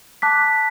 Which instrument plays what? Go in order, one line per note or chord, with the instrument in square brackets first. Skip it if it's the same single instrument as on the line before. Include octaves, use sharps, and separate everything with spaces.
[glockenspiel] A5 D6 F#6 B6